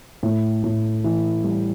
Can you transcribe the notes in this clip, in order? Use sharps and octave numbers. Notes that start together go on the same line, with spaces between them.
A2
A2
E3
G3